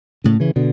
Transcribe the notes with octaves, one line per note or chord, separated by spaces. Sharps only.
A2 C#3
C#3 E3
B2 D3